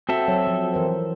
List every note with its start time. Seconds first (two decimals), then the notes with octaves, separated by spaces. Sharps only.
0.09 C4 F#4 A4 E5
0.28 F#3 C#5
0.47 F3
0.74 E3 A#4 C5